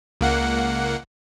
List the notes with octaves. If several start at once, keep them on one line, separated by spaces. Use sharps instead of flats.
C#2 A#3 F#5